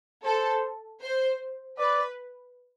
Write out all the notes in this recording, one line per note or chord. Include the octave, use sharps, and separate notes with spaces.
A4 C5
C5
B4 D5